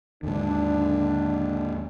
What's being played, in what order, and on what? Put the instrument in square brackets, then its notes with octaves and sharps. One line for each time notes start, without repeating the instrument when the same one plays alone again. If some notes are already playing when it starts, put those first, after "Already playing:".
[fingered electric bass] D#2 G#2 [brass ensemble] D3 D4